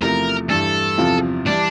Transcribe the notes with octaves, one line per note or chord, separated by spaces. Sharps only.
E2 C3 F3 A3 A#4
G2 E3 G3 A4
E2 C3 F3 C4 F4
E3 G3 D4